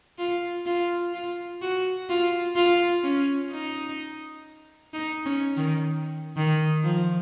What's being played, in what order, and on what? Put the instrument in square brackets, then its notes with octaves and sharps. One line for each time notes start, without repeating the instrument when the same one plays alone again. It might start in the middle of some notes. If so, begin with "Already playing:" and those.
[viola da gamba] F4
F4
F4
F#4
F4
F4
C#4
D#4
D#4
C#4
D#3
D#3
F3